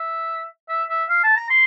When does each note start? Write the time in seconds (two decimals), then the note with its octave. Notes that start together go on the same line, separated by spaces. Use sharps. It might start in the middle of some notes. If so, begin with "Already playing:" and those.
Already playing: E5
0.69 E5
0.89 E5
1.09 F5
1.23 A5
1.37 A#5
1.50 C6